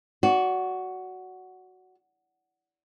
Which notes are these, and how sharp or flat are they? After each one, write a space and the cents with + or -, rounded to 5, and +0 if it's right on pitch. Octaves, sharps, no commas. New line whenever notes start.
F#4 +0 D5 -30